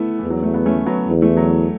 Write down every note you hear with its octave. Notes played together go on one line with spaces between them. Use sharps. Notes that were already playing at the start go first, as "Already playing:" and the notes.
Already playing: A3 B3 E4
E2 E3
F#3
A3
B3
A3 C#4
F#3 B3
E2
E3 A3
F#3